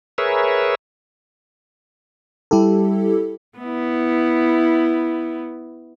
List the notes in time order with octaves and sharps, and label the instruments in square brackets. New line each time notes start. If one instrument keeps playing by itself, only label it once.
[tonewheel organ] G#4 A#4 B4 C#5 E5
[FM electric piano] G3 E4 G4 A4
[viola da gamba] B3 E4